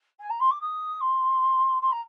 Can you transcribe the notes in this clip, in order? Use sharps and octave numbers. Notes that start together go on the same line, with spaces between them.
G#5
A#5
C6
D6
D#6
C6
C6
A#5